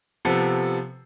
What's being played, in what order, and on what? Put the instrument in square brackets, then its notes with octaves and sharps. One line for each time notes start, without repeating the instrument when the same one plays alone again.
[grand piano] C3 F3 B3 A4